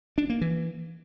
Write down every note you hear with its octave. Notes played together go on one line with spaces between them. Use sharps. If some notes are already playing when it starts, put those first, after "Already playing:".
D4
A#3
E3